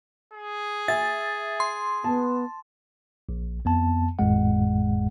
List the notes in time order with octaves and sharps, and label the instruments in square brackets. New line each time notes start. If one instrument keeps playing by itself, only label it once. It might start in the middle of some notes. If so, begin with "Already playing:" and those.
[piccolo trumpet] G#4
[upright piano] E5 G#5 [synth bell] A6
[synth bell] C6
[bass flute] B3 [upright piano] A5
[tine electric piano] A#1
F2 B3 A5
G#1 F2 A2 G#3 F#5